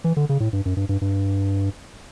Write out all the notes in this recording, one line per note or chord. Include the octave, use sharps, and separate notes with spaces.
E3
D3
C#3
A2
G2
F#2
G2
G2
G2